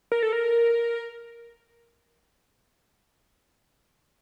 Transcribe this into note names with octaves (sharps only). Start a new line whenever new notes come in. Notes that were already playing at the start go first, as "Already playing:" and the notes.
A#4
A4
A#4